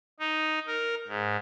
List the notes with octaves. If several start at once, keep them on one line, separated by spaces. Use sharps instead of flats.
D#4
A#4
G#2